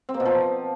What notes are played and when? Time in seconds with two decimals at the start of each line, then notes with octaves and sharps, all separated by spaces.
0.09 C4
0.14 A#3
0.20 B2
0.25 F3